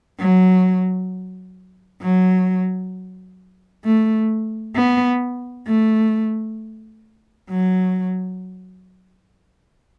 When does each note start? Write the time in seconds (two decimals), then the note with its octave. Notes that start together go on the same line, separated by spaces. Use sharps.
0.19 F#3
2.01 F#3
3.85 A3
4.75 B3
5.67 A3
7.50 F#3